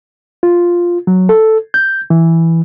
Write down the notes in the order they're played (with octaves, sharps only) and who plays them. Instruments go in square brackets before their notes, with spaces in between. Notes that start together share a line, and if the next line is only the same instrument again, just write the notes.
[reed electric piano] F4
F#3
A4
G6
E3